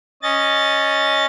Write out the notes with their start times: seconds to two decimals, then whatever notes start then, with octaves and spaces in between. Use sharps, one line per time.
0.23 C#4 D#5 A6